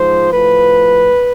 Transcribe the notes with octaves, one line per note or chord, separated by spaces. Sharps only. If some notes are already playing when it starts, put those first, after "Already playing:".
Already playing: G#2 F3 C5
A2 F3 B4